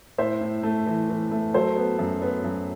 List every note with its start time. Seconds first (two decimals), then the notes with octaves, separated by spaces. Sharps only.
0.18 A2 C5 E5
0.41 A2
0.63 A3
0.87 E3
1.09 E3
1.31 A3
1.54 F#3 A4 C5
1.76 B3
1.99 F#2
2.22 B3
2.44 F#2